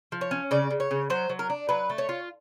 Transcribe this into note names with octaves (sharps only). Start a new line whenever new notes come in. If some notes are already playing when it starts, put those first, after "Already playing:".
F3
C#5
C#4
C#3 D5
C#3
C#5
C#3
F#3 C5
F#3
A#4
D4
F#3 B4
A3
C#5
F4